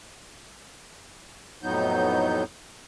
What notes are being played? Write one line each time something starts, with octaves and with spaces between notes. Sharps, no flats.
F2 A2 F#3 B3 D#4 G6